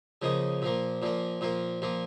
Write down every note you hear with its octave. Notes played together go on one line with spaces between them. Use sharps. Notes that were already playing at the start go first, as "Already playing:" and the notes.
C#3 F3 A#3 D#4
A#2 F3 A#3
A#2 F3 A#3
A#2 F3 A#3
A#2 F3 A#3